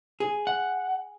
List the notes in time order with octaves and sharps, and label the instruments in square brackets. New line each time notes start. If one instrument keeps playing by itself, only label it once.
[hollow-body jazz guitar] G#4
[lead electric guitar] F#5